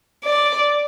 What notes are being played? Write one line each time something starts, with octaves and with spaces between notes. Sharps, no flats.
D5